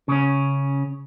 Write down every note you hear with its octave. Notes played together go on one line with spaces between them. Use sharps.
C#3 C#4